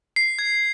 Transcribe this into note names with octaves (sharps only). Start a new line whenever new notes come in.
C7
G#6